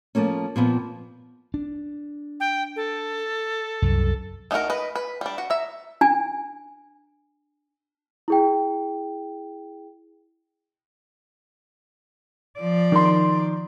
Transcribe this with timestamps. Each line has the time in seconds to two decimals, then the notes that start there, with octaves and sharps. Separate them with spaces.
0.15 F3 G3 A3 A#3 C#4
0.56 A#2 F3 B3 C4
1.54 D4
2.40 G5
2.76 A4
3.82 C2 F#2
4.51 A3 D#4 E4 F#4 A#4
4.70 B4 D#5
4.96 B4
5.21 G3 D4
5.38 F#4
5.50 E5 A#5
6.01 D4 G#5
8.28 E4 G#4 G5
12.60 F3 D5
12.92 D#3 C6